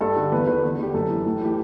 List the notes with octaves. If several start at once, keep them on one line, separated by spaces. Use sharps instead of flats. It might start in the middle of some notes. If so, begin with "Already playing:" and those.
G2 A4
D3
E2 B4
D3 B4
E2
D3 G4
F#2 A4
E3
A2
E3 G4